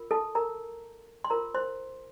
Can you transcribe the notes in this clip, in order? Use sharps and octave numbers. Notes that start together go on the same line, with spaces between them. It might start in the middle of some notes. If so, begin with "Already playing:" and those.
Already playing: F4 A#4
A4 A5
A#4 A#5
C6
F4 A4 A#4 C5 A#5
C5 C6